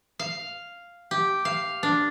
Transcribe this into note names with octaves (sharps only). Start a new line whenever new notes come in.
F5
G4
F5
D4